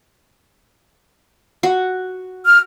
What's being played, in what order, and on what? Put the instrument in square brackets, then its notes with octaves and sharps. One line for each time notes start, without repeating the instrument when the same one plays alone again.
[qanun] F#4
[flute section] F6